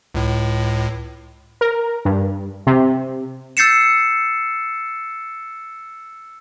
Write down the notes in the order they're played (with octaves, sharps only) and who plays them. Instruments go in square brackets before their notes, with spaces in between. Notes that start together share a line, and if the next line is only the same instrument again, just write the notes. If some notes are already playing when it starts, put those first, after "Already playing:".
[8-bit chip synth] C#2 A2
[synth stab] A#4
G2
C3
[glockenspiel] E6 G6 A6 C7 C#7 E7